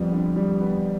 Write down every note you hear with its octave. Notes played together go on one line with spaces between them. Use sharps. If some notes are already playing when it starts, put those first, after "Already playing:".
Already playing: F2 G3 B3
D3
G3
B3